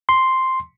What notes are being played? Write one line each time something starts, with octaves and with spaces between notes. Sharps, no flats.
C6